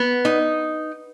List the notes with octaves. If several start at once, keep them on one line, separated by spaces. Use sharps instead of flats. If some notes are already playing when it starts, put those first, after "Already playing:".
Already playing: B3
D#4